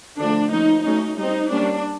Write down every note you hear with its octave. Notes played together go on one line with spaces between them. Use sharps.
D3 F3 A3 D4
F3 A#3 C#4 D#4
F#3 A3 C#4 D#4
G3 C4 D#4
G3 A#3 C#4 D4